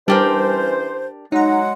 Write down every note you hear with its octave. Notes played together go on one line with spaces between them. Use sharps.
E3 G3 C#4 D4 G4 A#4 C5
F#3 G#3 D#4 F#5 A#5